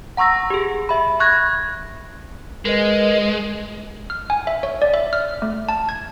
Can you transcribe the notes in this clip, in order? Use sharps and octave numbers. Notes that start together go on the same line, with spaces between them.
F#5 A#5 C#6 E6 A#6
G4 G#4
E5 B5
B5 C#6 F#6 G#6 A#6
G#3 A#4 B4 D#5
F6
G#5
E5
C#5
D5
E5
F6
A3
A5
G#6